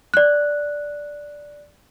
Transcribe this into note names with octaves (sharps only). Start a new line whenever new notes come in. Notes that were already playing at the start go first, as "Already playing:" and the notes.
D5 F#6